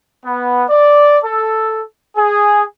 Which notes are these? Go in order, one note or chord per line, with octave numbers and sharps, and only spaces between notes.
B3
D5
A4
G#4